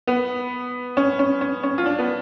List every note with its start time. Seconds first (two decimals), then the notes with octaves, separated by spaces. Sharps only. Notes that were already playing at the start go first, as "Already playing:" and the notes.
0.07 B3
0.97 C#4
1.19 C#4
1.41 C#4
1.63 C#4
1.78 F4
1.86 D4
1.99 B3